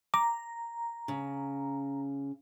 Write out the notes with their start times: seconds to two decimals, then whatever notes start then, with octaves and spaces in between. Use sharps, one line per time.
0.14 A#5 D6
1.08 C#3